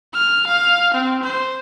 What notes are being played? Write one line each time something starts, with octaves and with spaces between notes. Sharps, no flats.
F6
F5
C4
C5